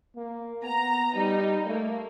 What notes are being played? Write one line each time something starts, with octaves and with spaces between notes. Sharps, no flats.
A#3
B3 A#5
G3 D#4
A3 A#3